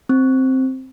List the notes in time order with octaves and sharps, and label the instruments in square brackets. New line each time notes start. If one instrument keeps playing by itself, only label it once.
[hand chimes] C4